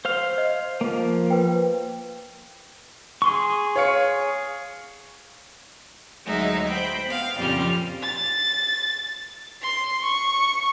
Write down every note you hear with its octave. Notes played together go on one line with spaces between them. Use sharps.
C5 F5 F6
D#5
F3 A#3
B4 G5
G#4 C6 C#6
C#5 F5 C#7
D2 F#3 G#3 D#4 E5
C5 G5 B5
B3 F5
F2 A#2 C#3 G3 F6
A6
C6
C#6